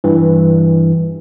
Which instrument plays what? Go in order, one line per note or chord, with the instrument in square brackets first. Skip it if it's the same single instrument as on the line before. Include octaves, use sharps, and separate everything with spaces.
[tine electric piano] G2 E3